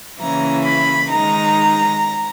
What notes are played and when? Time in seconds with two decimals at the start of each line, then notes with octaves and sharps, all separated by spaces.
0.19 C#3 E3 A#3 C#4 E4 A#5
0.65 B5
1.11 D#3 G#3 D#4 A#5